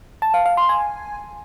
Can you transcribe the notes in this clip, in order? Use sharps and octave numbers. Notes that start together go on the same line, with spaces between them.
A5
F5
F5
C6
G#5